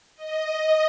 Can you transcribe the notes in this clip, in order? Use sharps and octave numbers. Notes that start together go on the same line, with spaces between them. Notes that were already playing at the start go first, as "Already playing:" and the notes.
D#5